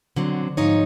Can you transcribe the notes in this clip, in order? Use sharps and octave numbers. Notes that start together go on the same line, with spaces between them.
D3 F#3 C4
G#2 F3 D#4 C#5